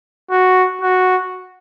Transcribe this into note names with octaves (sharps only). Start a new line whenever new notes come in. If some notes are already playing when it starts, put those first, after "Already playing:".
F#4
F#4